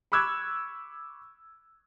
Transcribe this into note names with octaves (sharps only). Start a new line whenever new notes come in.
B5 C#6 D6 E6 F#6 G#6